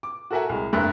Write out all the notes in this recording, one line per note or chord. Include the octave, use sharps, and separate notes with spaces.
D6
F#4 A4 A#4 E5 F#5 G#5
C2 G#3
F1 G2 A#4 E5 F#6